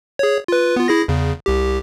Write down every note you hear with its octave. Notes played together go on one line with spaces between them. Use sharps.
G#4 C#5
F4 B4
B3 F4
E4 G#4 A#6
E2 C#3
C2 G4